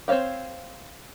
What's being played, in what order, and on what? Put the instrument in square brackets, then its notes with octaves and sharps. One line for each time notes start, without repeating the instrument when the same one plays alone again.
[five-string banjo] C4 C5 C#5 F5 G5